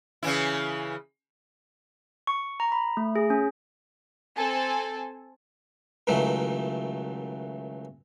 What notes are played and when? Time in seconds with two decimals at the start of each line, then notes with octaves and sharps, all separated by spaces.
0.23 C#3 E3 E4
2.27 C#6
2.60 A#5
2.72 B5
2.97 A3
3.16 G#4
3.30 C#4
4.37 C4 A4 G#5 A5
6.07 C#2 F#2 D#3 E3 F#3 A3